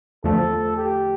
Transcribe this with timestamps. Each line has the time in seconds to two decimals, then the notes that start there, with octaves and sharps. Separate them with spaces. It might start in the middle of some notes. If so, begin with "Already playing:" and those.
0.24 E2 D3 F3 A3 A4
0.77 G4